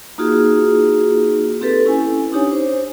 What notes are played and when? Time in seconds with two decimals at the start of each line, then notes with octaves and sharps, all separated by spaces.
0.18 A#3 D#4 F4 F#4 G#4
1.61 C4 G4 A4 B4
1.86 C#4 E4 G#5
2.32 D4 D#4 G4 C#5 G#5
2.52 C5